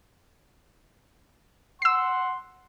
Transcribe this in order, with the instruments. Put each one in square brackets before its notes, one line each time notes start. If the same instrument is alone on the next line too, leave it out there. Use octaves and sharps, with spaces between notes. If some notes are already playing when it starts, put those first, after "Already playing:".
[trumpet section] F#5 C6 [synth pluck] E6 C7